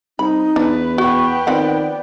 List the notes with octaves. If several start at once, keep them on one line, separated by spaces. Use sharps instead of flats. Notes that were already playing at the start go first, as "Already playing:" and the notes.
C2 D#4 B5
E2 D4 B4
B3 F#4 G5 C#6
D#3 F3 C4 D5 F#5